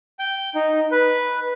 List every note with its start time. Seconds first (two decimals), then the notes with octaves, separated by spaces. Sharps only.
0.19 G5
0.55 D#4
0.91 B4